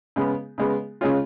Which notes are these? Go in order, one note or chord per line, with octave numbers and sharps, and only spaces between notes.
C#3 G#3 B3
C#3 G#3 B3
C#3 G#3 C#4 F4